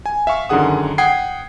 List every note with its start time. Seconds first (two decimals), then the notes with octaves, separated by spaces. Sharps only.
0.06 G#5
0.27 E5 F5 C#6
0.49 F#2 D3 D#3 G#4 F#5 D#6
0.98 F#5 G5 D#6 G#6 C7